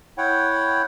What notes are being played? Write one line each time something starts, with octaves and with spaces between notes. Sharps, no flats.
E4 C#5 F#5 G5